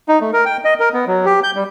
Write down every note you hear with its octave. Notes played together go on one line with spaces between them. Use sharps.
D#4
A3
A#4
G5
D#5
A#4
B3
F#3
G4
G6
G3